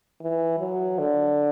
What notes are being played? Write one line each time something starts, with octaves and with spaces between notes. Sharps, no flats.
E3
F#3
D3